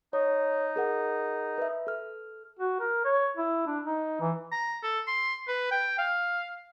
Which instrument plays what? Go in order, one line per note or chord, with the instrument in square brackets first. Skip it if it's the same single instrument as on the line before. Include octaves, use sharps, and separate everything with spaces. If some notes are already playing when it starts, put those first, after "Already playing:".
[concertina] D#4 [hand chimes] C#5
[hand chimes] G#4 A#4 F#5
B4 E5
A4 F6
[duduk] F#4
A#4
C#5
E4
D4
D#4
E3
[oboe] A#5
A4
C6
B4
G5
F5